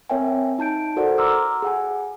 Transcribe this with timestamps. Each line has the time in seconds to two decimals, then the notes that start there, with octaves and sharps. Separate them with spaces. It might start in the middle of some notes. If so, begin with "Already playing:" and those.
0.10 C4 A#4 C#5 E5 G5 G#5
0.58 D#4 A5 G6 D7
0.96 F#4 A4 A#4 C5 D5 F#5
1.18 A#5 C6 D6 E6 F6
1.62 G#4 F#5 G#5